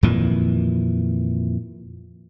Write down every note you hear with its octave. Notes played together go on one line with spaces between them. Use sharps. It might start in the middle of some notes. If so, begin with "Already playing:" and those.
F2 A#2 D#3 E3